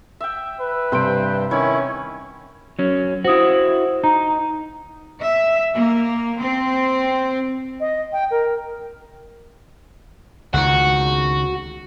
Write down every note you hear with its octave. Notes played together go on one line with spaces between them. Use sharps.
E5 G5
B4
G2 C3 C5 G5 D7
D#3 C#4 E4 C#5
F#3 C#4
E4 F#4 C5 D#6
D#4 A#5
E5
A#3
C4
D#5
G5
A#4
C#2 D#3 F#4